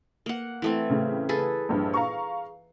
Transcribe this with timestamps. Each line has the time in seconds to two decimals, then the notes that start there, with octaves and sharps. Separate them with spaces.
0.26 A#3 F#5
0.62 E3 A3 C4
0.90 A2 C#3
1.29 G#4 A4 B4
1.69 A#1 G2
1.94 F5 A#5 C#6